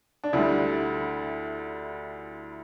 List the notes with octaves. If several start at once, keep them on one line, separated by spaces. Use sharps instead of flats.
D4
D2 D3 G3 E4